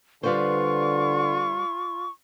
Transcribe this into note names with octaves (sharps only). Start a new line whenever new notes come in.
D3 G3 F4 B4 C5 C#6